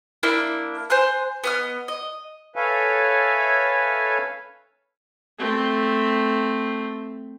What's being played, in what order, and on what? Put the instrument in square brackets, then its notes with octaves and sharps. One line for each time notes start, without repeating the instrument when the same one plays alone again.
[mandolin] A#3 D4 E4
C5 G#5 C6 F#6
B3 D#5 F6
D#5
[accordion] A4 B4 C#5 E5 F5 G#5
[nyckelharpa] A3 C4